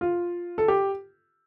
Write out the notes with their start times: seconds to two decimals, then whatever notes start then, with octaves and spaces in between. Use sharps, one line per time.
0.01 F4
0.58 A4
0.68 G4